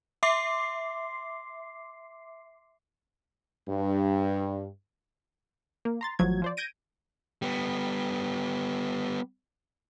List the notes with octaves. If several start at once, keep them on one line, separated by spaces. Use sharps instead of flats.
E5 C6 D6 C7
G2
A#3
A#5 C6 A6
A1 F3 F#3 G#6
F3 C5 D5
G6 G#6 A#6 D7 D#7
G3 B3